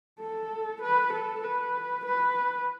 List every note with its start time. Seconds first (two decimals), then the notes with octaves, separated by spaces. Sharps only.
0.20 A4
0.82 B4
1.13 A4
1.44 B4
2.06 B4